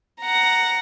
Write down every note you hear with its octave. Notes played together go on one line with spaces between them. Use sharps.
F#5 A#5